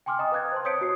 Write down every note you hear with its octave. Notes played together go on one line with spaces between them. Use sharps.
G5 G#5 C6 D6 F6
D#5 G5 A#5 D#6
B4 F5 F#6 G#6 A6
C5 A5 C6
C#5 D#6 G6 B6 C#7 D7
F#4 D#6 C7